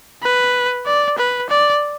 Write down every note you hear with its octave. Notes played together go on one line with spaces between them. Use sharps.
B4
D5
B4
D5